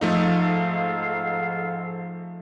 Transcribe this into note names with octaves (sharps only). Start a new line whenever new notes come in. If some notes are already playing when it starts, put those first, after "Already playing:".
G#2 F3 A3 D#4 A4 F5